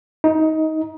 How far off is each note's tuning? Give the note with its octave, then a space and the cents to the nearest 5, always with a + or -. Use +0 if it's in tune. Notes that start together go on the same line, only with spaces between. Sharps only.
D#4 +20